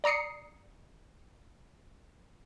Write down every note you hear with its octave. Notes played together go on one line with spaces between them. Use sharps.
D5 A#5 D#6 C7 C#7